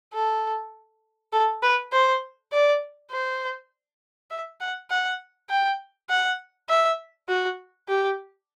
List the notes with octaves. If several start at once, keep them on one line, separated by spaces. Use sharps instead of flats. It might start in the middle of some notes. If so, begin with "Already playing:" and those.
A4
A4
B4
C5
D5
C5
E5
F#5
F#5
G5
F#5
E5
F#4
G4